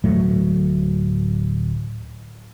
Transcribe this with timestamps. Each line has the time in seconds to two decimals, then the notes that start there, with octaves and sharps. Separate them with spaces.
0.04 D1 A2 F#3 A3